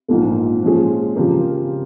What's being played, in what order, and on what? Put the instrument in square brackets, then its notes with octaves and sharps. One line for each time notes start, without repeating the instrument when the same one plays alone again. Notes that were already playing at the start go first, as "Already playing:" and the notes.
[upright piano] A#1 G#2 F3 A#3
A#2 F3 G#3 C#4 G#4
C#3 F3 C4 G4 A#4